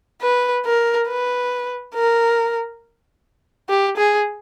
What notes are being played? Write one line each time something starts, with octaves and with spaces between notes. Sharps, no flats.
B4
A#4
B4
A#4
G4
G#4